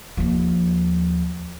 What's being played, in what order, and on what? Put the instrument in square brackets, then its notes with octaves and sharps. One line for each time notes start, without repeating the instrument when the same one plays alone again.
[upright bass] D#2 F3